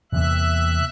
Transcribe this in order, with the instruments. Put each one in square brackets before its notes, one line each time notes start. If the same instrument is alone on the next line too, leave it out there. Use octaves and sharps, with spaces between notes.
[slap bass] E2 C3 A#3 [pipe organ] E5 F#6